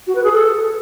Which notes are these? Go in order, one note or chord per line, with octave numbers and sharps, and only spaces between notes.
F#4
B4
G#4
A4